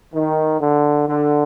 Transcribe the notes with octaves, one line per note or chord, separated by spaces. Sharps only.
D#3
D3
D3